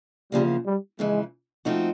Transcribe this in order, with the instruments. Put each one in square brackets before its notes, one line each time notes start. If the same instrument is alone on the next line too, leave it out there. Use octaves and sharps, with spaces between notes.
[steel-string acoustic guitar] E2 C#3 F3 A#3 [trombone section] G3
[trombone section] G3
[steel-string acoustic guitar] F2 C#3 E3 [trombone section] G#3
[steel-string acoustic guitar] F3 A3 C4 D#4 F#4